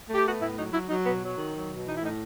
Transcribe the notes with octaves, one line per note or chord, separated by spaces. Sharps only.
A3
G4
B3 F#4
A2 E4
F#3 D#4
F#3 E4
F#3 D#4
B2 B3
F#3
D#3
F#3
B2
E3 D#4
E4
A2 D#4